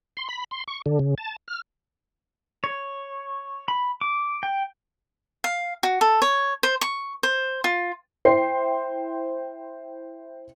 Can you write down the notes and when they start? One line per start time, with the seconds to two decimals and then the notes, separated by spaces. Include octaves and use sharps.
0.17 C6
0.29 B5
0.51 C6
0.68 C#6
0.86 D3
0.99 C#3
1.18 A5
1.48 F6
2.64 C#5
3.68 B5
4.01 D6
4.43 G5
5.44 F5
5.83 F#4
6.01 A4
6.22 C#5
6.63 C5
6.81 C#6
7.23 C5
7.64 F4
8.25 E4 C5 G5 C7